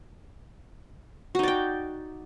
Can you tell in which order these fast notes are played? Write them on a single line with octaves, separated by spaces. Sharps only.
F#4 D#4 D5 G5